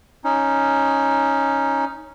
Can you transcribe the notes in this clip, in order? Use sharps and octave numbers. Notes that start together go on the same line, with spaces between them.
C#4 D#4